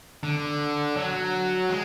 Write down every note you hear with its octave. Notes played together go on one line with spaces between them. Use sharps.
D3
F#3
G#3